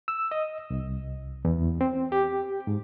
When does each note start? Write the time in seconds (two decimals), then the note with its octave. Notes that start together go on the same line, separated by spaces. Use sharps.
0.08 E6
0.31 D#5
0.70 C2
1.45 E2
1.81 C4
2.12 G4
2.67 G#2